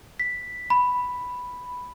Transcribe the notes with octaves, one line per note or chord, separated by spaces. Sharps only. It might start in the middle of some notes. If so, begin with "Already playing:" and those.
B6
B5